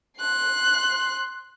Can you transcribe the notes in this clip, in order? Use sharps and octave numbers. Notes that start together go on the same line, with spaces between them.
C6 F#6